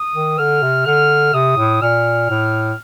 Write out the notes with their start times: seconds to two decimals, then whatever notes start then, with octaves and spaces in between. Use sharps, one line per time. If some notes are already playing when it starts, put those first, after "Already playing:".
Already playing: D#6
0.15 D#3
0.38 D3 F6
0.63 C3
0.86 D3 F6
1.33 C3 D#6
1.57 A2
1.81 A#2 F6
2.30 A2